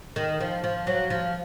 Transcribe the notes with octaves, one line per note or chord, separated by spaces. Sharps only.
D#3
F3
F3
F#3
F3